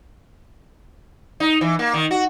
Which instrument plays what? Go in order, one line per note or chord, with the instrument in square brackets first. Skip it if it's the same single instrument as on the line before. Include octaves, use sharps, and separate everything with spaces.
[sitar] D#4
E3
A#3
D#3
F#4